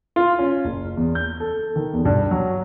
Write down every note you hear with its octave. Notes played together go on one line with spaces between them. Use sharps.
F4
C#4
F#1
E2
G6
A4
D#3
E2
G2
F#3